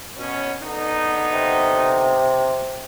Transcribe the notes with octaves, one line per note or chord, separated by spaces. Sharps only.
B2 C#4
D3 B3 D#4
C3